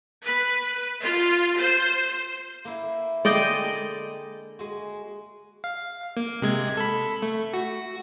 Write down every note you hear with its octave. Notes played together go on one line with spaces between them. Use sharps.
B4
F4
C5
A#3 E4
D3 G#3 A#3 D5 D#5 G5
G#3 F#4
F5
A#3
C3 G#3 G#6
A4 B5
A3
F#4